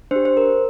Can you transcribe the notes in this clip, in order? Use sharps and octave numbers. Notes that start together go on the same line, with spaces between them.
D4 G4 C5
C5
A#4